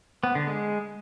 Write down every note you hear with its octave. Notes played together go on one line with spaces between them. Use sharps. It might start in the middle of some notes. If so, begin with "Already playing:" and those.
B3
D3
G#3